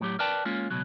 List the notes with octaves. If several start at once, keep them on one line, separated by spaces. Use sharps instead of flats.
A2 F#3 G4
A#4 B4 D5 G5 A5
G#3 A#3 C#4 F4
C#2 F#2 B2 F#3